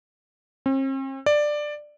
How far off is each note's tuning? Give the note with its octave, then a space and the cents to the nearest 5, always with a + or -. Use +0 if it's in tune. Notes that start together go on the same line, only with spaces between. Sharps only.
C4 +45
D5 +10